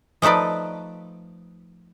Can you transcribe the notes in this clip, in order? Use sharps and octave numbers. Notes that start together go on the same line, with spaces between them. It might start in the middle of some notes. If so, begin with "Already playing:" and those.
F3 A3 D#4 B4 D5